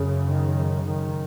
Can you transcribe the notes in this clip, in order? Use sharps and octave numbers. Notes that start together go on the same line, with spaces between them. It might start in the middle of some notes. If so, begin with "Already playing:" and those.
Already playing: F#2 C#3
D#3
D#3